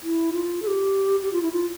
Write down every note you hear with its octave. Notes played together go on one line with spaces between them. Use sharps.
E4
F4
A4
G4
G4
F4
E4
F4